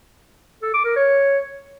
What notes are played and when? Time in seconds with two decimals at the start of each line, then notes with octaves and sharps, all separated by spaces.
0.63 A4
0.74 D6
0.85 A#4
0.96 C#5